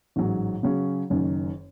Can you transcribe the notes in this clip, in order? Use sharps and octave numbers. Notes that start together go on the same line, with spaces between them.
A1 G#2 F#3
C#3 F#3 C#4
F#1 F#2 D#3